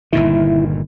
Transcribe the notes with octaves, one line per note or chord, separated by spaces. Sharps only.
G1 A#2 D#3 E4